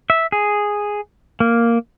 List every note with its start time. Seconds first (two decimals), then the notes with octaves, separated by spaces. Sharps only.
0.10 E5
0.32 G#4
1.40 A#3